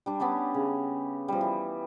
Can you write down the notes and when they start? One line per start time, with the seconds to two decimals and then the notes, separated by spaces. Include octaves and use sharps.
0.06 G3 D4
0.20 B3 C#4 D4 G4
0.54 C#3
1.28 F3 G3
1.41 E3